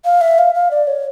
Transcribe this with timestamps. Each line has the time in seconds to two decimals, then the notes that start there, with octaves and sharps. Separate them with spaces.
0.05 F5
0.21 E5
0.38 F5
0.55 F5
0.71 D5
0.87 C#5